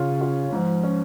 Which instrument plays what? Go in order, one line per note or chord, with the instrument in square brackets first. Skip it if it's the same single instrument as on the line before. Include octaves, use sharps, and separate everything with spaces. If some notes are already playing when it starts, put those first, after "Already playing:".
Already playing: [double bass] C#3 [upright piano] C#4 F4
[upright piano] F4
[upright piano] G#2 [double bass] F3
[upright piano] C#4